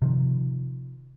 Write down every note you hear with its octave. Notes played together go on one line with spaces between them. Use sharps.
C3 D#3 F3